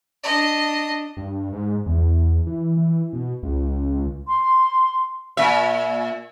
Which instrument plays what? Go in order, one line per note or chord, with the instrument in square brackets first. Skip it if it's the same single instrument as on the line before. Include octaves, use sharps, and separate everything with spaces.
[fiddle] D4 D#5
[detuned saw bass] G2
G#2
E2
E3
E3
B2
C#2
[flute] C6
[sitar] A#2 E5